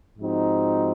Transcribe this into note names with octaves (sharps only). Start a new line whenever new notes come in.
G#2 F3 C4 D#4 F#4